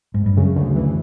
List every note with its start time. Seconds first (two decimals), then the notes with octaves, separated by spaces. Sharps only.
0.14 G#2
0.26 G2
0.37 F#2 C#3
0.56 D2
0.76 E3